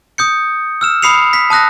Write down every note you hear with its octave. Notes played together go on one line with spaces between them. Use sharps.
D#6 G6 C#7
E6 F6 E7
B5 D#6 C7 C#7 F7
B6
A5 D#6 F#6 A#6